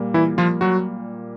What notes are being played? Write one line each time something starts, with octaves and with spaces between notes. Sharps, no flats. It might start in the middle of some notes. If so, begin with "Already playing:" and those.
Already playing: A#2 G3 A#3
E3 E4
F3 F4
F#3 F#4